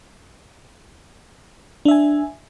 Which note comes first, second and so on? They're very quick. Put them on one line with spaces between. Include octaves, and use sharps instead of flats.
D4 E5 G#5